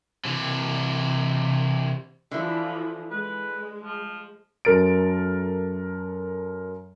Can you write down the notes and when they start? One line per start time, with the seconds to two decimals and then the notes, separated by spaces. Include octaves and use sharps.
0.25 C3 E3
2.31 D3 E3 F3 E4
3.11 G#3 B4
3.84 F3
4.65 F#2 A4 A#4 A6 D7